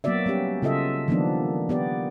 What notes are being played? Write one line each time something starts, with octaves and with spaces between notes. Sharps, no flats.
F#3 A#3 B3 F#4 D5 E5
G3 B3 C#4 G4
C#3 F4 A4 D#5 E5
D#3 F3 G3 A#3 B3 D4
B3 G4 D5